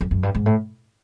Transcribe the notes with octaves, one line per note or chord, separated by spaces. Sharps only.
F2
F#2
G2
G#2
A2